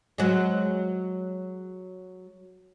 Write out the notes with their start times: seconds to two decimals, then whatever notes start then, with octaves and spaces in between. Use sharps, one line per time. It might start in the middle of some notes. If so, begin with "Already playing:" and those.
0.18 F#3 G#3